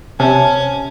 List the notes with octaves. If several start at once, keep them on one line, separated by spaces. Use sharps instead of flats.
C3 C#4 A5